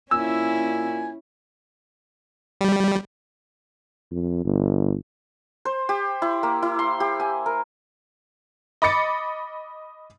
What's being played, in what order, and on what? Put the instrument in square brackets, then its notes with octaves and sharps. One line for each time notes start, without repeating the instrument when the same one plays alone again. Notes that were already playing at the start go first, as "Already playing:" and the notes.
[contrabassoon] A#2 [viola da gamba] C#4 E4 [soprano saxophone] G#5 [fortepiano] E6
[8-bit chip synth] G3
[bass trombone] F2
G1
[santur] C5
G4
E4
A#3
E4
C6
G4
G#5
A#4
[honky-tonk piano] D#5 B5 D6 A6 C#7